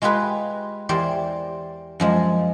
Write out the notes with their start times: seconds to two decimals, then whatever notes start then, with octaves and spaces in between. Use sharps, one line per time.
0.02 G#3 F4 G4 G#4 B4 G#5
0.89 E2 G4 A#4 C5 D5
2.00 F#2 F3 G#3